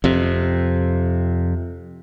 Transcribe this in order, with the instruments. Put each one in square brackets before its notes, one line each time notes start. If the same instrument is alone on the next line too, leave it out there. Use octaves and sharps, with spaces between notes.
[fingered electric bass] F2 C3